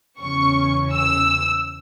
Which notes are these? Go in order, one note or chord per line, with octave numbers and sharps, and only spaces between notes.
E2 C#3 E3 C#4 C#6
E6